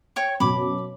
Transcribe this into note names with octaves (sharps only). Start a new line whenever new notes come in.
C#5 G5 C#6
F#2 B2 B5 D6